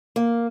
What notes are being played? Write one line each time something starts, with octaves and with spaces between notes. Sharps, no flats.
A#3